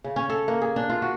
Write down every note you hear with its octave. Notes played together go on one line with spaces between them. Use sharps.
C#3
C#4
A4
A#3
G#4
D4
F4
F#4